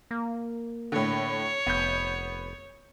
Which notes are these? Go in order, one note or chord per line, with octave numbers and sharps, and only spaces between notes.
A#3
A2 D3 C#5
F1 B3 G6